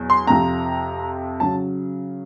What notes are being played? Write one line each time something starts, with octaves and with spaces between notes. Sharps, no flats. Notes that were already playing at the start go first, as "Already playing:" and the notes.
Already playing: E2 B2 F#3
C6
F2 C3 F3 A#5
C#3 F#3 A5